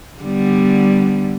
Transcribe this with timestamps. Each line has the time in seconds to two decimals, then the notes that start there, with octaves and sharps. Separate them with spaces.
0.21 D3 G3 B3